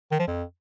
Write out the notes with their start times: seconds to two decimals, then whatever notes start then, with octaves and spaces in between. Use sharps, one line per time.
0.11 D#3
0.19 F3
0.27 F2